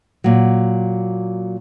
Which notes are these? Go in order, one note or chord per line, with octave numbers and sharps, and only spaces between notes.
A#2 F#3